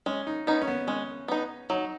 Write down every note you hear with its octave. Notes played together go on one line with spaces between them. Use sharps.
G#3 C#4
D#4
B3 C#4 D#4
C#4
B3
G#3 C#4
B3 D#4
F#3 D#4